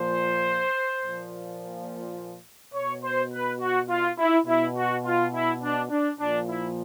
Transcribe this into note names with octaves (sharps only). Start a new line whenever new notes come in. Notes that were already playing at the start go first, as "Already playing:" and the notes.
Already playing: A#2 F3 C5
A#2 F3
B2 C#5
C5
B4
F#4
F4
E4
B2 E4
F#4
F4
E4
D4
D4
A#2 F3 D4
E4